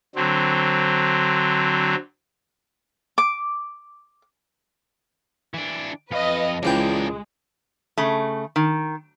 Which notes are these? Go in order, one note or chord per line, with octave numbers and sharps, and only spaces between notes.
D3 F#3 C4
D6
E3 D4
F2 B4 D#5 F5
C#2 E3 G#3 A#3 D4 G5
C#3 A3
D#3